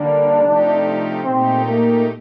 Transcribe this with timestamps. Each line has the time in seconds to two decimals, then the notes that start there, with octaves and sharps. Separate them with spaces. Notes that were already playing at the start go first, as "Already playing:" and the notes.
Already playing: D3 G3 A#3 D4
0.40 C3 F3 A3 D#4 G4
1.24 A#2 A3 C4 D#4 G4
1.66 A#3